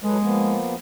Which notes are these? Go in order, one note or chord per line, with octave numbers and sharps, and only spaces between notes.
F#3 G#3 A4 B4
F3 A#3 B3